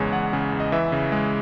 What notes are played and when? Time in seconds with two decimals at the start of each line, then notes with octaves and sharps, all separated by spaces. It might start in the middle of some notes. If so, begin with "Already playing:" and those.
Already playing: E2 C#3 G#3 C#5
0.12 E2 F#5
0.33 C#3
0.52 E2
0.60 D#5
0.72 E3 E5
0.92 C#3
1.12 G#3